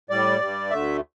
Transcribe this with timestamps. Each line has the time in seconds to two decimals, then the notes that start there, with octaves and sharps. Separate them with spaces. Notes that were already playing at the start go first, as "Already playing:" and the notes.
0.10 A2 G3 D5
0.41 G2 G3
0.70 D2 D3 A3 E5